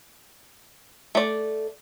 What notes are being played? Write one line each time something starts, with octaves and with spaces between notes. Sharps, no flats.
A3 D5